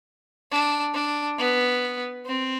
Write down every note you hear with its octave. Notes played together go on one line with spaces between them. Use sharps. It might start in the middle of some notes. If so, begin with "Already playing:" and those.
D4
D4
B3
C4